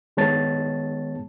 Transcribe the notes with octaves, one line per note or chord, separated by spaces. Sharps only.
D#3 G#3 B3 C#5 A5 A6